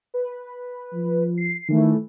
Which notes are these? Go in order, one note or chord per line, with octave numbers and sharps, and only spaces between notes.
B4
F3
C7
D#3 E3 A3